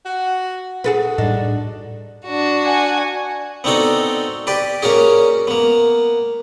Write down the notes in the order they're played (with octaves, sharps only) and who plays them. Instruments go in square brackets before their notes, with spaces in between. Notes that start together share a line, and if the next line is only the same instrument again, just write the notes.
[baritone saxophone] F#4
[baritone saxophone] F#4 [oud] G#4 A4 B4
[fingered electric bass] A2 G3 [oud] D4 D#4
[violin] D4 F#4
[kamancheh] F#5 G#5
[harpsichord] B3 C4 D4 D#4 F#4 A4
G4 B4 D5
A#3 C#4 F#4 G#4
A#3 B3